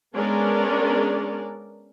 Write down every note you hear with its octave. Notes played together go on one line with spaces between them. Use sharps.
G#3 B3 C#4 D4 A#4 D5